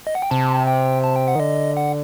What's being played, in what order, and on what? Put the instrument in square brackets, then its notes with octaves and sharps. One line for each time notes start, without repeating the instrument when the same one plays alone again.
[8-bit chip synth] D#5
F#5
G5
[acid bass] C3 [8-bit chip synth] A5
[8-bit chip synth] G5
A5
G5
F#5
[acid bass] D#3
[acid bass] D3 [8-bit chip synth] D#5
[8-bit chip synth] F#5